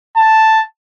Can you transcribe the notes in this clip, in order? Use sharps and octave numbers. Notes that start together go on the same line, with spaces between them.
A5